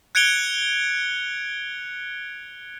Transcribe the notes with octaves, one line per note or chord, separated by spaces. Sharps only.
F#6 G#6 C#7 D7 F7 G7